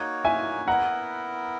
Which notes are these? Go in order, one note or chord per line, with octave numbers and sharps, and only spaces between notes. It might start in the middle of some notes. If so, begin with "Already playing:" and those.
Already playing: A#3 D#4 F#4 C#5
E5 G#5
B3 E4 A#4 F#5 A#5